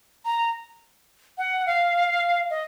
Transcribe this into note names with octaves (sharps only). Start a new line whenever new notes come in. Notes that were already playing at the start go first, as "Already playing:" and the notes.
A#5
F#5
F5
D#5